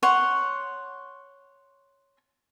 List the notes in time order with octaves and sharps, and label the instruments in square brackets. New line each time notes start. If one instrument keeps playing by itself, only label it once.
[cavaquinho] C#5 F#5 C6